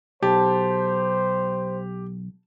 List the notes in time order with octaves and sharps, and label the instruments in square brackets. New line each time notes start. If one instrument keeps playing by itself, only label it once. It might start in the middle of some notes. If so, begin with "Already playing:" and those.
[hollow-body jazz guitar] B1 [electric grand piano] G4 [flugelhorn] C5 [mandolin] A5